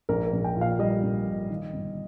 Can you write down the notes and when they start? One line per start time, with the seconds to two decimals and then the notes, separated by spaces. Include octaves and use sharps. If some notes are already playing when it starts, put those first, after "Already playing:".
0.09 A#1 A#4
0.26 A#4
0.33 A#1
0.44 G5
0.56 A#2
0.61 F5
0.79 G3 D#5
1.03 A#1
1.26 A#2
1.50 D#3
1.73 G1